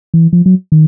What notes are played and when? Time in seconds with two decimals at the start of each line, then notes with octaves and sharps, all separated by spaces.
0.14 E3
0.33 F3
0.46 F#3
0.72 D#3